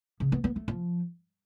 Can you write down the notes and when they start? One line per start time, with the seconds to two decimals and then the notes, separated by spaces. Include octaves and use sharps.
0.20 C#3
0.32 B3
0.44 B3
0.56 A3
0.68 F3